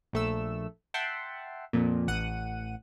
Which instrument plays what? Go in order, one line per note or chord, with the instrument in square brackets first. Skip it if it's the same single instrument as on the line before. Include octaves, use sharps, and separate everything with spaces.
[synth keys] A#1 A3 E6
E5 F#5 G5 A5 C6
F2 A#2
A1 F#5 D#7